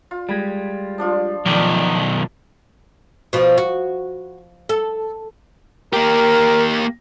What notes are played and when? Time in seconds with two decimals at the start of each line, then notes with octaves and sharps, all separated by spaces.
0.11 F4
0.29 G3 G#3 B5
0.98 F3 D4 F4
1.46 B1 D#3 F3 D4 A4 D5
3.33 B2 F3
3.58 F#4
4.69 A4
5.93 A#3 G4 A#4